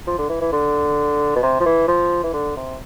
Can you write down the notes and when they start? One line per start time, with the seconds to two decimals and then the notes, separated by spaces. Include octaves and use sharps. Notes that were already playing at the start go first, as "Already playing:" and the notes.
0.07 F3
0.18 D3
0.29 E3
0.41 E3
0.52 D3
1.36 B2
1.43 C3
1.60 F3
1.66 E3
1.88 F3
2.24 E3
2.33 D3
2.57 C3